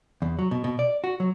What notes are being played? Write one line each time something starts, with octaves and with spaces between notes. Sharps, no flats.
E2
F#3
B2
B2
D5
F#4
F#3